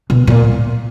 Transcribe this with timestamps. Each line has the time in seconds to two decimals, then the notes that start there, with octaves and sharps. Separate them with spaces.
0.10 B2
0.27 A#2